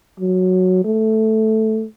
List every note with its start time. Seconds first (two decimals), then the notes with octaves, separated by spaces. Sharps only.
0.20 F#3
0.84 A3